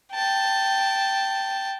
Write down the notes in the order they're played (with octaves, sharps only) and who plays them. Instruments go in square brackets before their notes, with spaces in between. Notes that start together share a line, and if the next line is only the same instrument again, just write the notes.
[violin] G5 A5